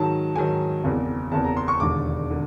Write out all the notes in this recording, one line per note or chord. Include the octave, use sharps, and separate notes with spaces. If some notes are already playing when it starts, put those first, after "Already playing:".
Already playing: G#2 D#3 F#3 A5
G#2 D#3 F#3 G#5
F#1 E2 C3
F#1 E2 C3 A5
A#5
C6
C#6
E1 D#2 D3 G3 D6
D3